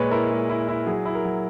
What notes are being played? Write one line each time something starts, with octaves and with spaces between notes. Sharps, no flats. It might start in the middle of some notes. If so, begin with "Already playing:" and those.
Already playing: A#2 G#3 B4 C#5
E4 A#4
G#3
E4
E4
F#3 G#4
E4
A#4
F#3